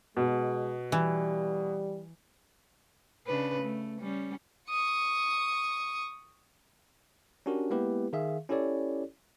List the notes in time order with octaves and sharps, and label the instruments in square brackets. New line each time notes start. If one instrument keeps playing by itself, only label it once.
[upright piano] B2 [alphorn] G#3
[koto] E3 [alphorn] G3
[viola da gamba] C#3 D4 B4
A3
G3 C#4
[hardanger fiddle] C#6 D#6
[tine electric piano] C#4 D4 F#4 G4 A#4
G#3 A#3 B3 E4 G4 B4
D#3 G#4 E5 F5
C#4 E4 G4 A4 C#5 D5